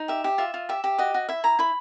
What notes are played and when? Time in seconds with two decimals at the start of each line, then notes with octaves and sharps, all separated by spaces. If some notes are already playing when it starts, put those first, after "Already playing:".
Already playing: D#4
0.08 G4 E5
0.24 G4
0.38 F4 E5
0.54 F4
0.69 G4 E5
0.84 G4
0.98 F#4 D#5
1.14 F#4
1.29 E4 E5
1.44 E4 A#5
1.59 E4 B5